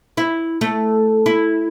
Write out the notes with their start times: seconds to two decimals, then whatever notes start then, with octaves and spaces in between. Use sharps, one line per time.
0.17 E4
0.61 A3
1.26 E4